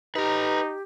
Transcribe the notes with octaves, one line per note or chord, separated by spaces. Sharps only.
D#4 G4 B4 A#5